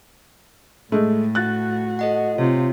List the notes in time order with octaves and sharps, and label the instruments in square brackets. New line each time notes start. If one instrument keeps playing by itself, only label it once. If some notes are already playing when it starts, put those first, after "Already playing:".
[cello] A2 [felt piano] G#3 A3
[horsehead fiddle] F#4 [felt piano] F#6 A6
[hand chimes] A4 D#5 F#5
[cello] C3 [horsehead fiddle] F4 [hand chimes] C#5